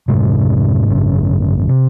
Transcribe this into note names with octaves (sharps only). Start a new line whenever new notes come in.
F1 F2 G#2 C3 G#3
G#1 F#2 C#3
C3